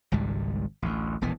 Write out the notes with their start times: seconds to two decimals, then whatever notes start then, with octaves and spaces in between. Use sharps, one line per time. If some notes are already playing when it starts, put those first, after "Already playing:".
0.12 G#1 C#2 G#2 G3
0.82 A1 D2
1.21 E1 A#1 E3 B3